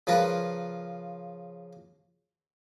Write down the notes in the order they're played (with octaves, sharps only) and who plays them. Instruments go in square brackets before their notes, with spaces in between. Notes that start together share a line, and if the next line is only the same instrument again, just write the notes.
[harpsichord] C#3 F3 F4 A#4 B4